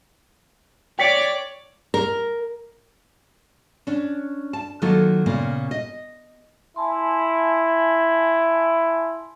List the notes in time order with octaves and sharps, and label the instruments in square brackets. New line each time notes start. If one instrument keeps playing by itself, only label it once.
[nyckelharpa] C#5 [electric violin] D5 D6 [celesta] G5 B6 C#7
[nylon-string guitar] A#4
C#4 D4
A5
D#3 F#3 A#3 F4 A4
A#2 C#3 A#3 B3
D#5
[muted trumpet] E4 [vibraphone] G#5 A5 C6